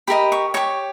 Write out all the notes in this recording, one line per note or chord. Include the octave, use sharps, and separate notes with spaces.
G4 A#4 D#5 B5
C#6
G4 C#5 C#6